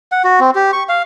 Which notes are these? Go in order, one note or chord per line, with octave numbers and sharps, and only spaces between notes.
F#5
F#4
C4
G4
C#6
F5